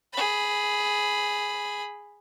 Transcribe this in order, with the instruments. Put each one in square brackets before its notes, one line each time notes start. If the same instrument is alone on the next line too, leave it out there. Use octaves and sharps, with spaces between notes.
[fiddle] G#4 B5